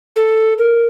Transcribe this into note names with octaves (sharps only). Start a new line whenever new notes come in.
A4
A#4